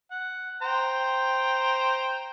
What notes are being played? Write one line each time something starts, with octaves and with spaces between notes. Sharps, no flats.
F#5
C5 G5 A#5